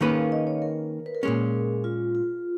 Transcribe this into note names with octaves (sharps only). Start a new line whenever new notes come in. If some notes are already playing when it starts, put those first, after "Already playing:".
D#3 A#3 C#4 G#4 B4 F5
D#5
C#5
A#4
B4
A#4
A#2 G#3 C#4 G#4
F4
F4